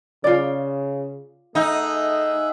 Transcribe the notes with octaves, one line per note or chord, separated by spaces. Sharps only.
C#3 F4 D5
A3 D#4 G#4 E5 F#5